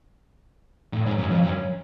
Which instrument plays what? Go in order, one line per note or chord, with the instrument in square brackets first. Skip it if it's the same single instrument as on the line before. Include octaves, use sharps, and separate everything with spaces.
[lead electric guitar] A2
G#2
F#2
F2
F#2